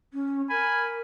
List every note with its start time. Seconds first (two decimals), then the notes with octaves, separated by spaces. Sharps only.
0.13 C#4
0.50 A#4 G#5 B5